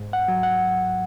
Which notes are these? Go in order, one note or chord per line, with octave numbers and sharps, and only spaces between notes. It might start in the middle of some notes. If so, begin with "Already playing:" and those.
Already playing: G#2
F#5
F#3
F#5